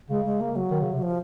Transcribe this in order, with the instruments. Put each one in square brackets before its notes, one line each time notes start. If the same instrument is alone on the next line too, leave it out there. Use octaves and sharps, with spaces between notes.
[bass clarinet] C#3 [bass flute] G#3
[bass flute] G#3
A#3
F#3
[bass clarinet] D#3
C#3
C3
[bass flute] F#3
F3